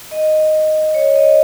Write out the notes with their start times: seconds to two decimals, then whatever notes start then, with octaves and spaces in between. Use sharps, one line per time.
0.11 D#5
0.95 C#5
1.16 D#5